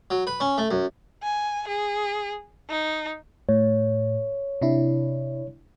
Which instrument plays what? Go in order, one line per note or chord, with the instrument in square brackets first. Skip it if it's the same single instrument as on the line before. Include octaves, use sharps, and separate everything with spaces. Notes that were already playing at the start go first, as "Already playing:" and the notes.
[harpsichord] F#3
B4
C#4
A3
F#2
[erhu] G#5
G#4
D#4
[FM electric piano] A2 [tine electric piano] C#5
[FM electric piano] C3 D4 E4